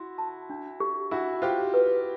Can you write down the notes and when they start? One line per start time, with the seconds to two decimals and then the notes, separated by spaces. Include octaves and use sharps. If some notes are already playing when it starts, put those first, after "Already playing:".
Already playing: E4 F#4 C6
0.18 A5
0.50 D4
0.80 G4
1.11 D4 E4 F#4
1.42 F4 G4 C5
1.74 B4